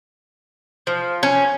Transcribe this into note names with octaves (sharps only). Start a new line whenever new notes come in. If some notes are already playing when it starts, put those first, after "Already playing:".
F3
C#4